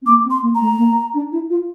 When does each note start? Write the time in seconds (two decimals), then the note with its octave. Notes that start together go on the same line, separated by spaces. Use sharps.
0.02 C4
0.06 A#3 D6
0.25 C4
0.30 C6
0.42 A#3
0.55 A#5
0.61 A3
0.78 A#3
1.14 D4
1.32 E4
1.50 F4